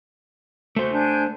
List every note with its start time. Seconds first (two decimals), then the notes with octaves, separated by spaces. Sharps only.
0.76 A3 F#4 C5 G6
0.92 D4 G#5 G6